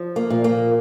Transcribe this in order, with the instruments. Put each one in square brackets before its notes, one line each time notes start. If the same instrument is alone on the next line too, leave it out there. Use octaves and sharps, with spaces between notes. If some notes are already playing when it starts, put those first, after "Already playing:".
Already playing: [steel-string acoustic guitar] F3
A#3
A#2
A#3